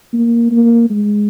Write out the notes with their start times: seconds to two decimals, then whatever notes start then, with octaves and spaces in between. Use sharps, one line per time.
0.13 A#3
0.51 A#3
0.90 G#3